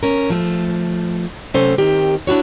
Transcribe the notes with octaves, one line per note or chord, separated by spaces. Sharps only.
C#4 A#4
F3 A3
C3 F#3 A3 C#4 A4 C5
D#3 C4 G4 A#4
D4 E4 F#4 C#5